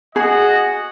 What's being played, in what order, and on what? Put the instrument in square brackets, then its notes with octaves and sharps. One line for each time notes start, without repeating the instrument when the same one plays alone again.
[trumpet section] F#4 D#5 [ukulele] G#4